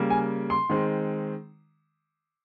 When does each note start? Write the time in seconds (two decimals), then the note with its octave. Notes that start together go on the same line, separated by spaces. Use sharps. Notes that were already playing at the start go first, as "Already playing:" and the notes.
Already playing: C#3 G3 A#3
0.10 G#5
0.50 C6
0.70 D#3 G#3 C4